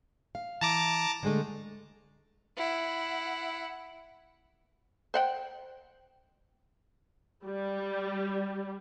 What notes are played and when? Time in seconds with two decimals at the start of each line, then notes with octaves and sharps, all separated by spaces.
0.35 F5
0.61 E3 A5 A#5 D6
1.23 D3 G#3 A3
2.57 E4 F#5
5.14 C5 F#5 G5
7.45 G3